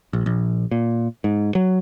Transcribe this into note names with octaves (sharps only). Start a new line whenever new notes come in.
A#1
A#1
A#2
G#2
F#3